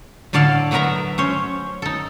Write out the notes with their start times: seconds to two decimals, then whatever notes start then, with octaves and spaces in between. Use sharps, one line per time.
0.33 A2 D3 A4 D5 F5 A5
0.71 F#3 A3 B3 A#4 E5 A#5
1.18 C#4 C5 C#5
1.82 D#4 A4